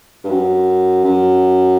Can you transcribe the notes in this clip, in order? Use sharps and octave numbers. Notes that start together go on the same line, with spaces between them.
G2
F#2
F#2